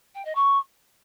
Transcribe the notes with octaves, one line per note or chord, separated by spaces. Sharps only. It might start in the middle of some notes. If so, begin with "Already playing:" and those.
G5
D#5
C#6